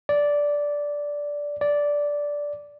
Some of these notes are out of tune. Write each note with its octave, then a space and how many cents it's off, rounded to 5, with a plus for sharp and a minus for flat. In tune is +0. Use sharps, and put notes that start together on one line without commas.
D5 -10
D5 -10